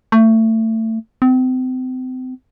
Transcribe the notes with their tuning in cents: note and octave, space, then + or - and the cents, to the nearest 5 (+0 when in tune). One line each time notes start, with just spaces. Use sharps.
A3 +25
C4 -35